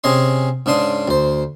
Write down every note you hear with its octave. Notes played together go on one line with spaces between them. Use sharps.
C3 C#4 G#4 D#5 C6
G#2 C#3 D4 C6 D#6
D2 C5